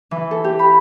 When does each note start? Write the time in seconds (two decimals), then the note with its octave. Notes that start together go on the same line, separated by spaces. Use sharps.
0.11 E3
0.31 A4
0.44 G4
0.59 B5